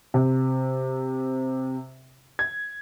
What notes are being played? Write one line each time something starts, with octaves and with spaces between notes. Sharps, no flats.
C3
G#6